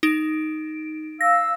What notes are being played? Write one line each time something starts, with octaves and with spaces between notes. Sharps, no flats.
D#4 D7
F5 E6 A#6